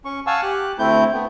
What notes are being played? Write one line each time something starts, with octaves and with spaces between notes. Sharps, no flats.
C#4 C#6
F5 F#5 G#5 A5 C#6 E6
G4 F#6
D2 A3 C4 E4 G6
A3 B3